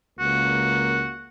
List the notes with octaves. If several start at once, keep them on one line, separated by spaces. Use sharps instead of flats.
C#2 A#3 F#4